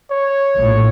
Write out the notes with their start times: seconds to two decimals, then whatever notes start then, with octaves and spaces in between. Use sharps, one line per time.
0.11 C#5
0.57 A#1 A2